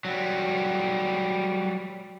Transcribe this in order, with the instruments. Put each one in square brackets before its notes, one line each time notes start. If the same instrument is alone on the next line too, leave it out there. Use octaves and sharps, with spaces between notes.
[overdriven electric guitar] F#3 G3